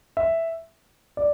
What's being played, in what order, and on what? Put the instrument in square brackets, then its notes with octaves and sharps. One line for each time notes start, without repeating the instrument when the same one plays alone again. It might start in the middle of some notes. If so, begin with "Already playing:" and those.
[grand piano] E5
D5